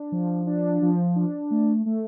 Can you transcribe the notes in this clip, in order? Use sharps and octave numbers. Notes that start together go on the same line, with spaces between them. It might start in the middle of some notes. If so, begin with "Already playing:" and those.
Already playing: D4
F3
D4
F3
D4
A3
A3